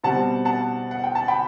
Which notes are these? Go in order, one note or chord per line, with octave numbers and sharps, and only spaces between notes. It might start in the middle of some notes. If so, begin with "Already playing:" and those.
B2 G3 C4 F#5 A5
F#5 A5
F#5
G5
A5
G5 B5